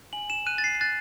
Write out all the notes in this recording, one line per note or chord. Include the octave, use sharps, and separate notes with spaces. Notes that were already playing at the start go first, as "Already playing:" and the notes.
G#5 F#7
E7
F#6 D#7
A6
C7
C7
F#6 A6